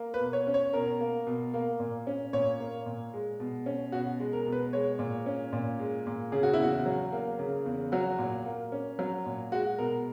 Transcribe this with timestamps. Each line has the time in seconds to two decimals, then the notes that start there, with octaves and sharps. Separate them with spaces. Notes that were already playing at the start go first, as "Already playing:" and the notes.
Already playing: A#3
0.14 B4
0.20 B2
0.33 C#5
0.47 C#4
0.54 C#5
0.73 B2 A#4
1.00 A#3
1.27 B2
1.54 A#3
1.80 A#2
2.07 C#4
2.33 A#2 C#5
2.60 A#3
2.86 A#2
3.13 G#3
3.40 B2
3.66 C#4
3.92 B2 F#4
4.20 G#3
4.33 A#4
4.46 B2
4.52 B4
4.73 G#3 C#5
4.99 A#2
5.26 C#4
5.53 A#2
5.79 G#3
6.07 A#2
6.32 C#3 G#4
6.43 F#4
6.53 E4
6.60 E2 F#4
6.86 F#3
7.12 A#3
7.39 C#3
7.66 E2
7.92 F#3 F#4
8.19 A#2
8.46 A#3
8.72 C#4
8.99 F#3
9.26 A#2
9.52 G#3 F#4
9.79 B2 A#4